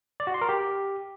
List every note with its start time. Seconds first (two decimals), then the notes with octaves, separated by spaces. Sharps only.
0.20 D5
0.27 F#4
0.34 C6
0.42 A#4
0.49 G4